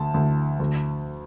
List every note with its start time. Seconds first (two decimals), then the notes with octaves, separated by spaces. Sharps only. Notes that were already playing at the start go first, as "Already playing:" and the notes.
Already playing: D2 A5
0.14 D2
0.59 D2